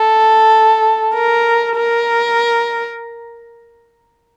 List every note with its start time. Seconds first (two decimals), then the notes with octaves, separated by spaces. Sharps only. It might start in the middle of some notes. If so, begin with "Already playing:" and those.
Already playing: A4
1.14 A#4
1.76 A#4